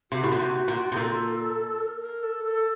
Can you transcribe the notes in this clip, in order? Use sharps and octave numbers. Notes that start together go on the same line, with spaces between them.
C3 F#4
A2
A#2
C3
A#2
C3
A#2 A4
A#4
A#4
A4
A4